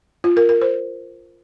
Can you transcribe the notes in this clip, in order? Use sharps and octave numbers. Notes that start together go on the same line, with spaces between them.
F4
A#4
A#4
C5